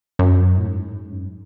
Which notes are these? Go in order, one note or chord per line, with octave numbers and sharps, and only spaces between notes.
F#2
A2
G#2
F#2